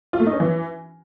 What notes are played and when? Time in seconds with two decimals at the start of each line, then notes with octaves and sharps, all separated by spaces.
0.13 F4
0.20 A3
0.27 D#4
0.33 C#4
0.40 E3